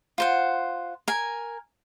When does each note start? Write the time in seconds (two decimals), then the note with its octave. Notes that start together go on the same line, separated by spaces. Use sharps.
0.18 F4 C5 F#5
1.08 A#4 G#5